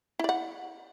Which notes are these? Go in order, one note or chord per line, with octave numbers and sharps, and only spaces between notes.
E4 D5 F#5